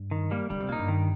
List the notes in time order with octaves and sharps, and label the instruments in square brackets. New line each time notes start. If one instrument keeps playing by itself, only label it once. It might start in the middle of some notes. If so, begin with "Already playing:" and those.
Already playing: [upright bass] G2
[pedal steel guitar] D#3
G3 A#3
[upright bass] D3 [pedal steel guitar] G3
[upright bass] C3
[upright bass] A#2 [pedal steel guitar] A#3 D#4
[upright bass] G2
[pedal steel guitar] D#3